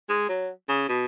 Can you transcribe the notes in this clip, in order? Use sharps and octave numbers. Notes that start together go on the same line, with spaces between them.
G#3
F#3
C#3
B2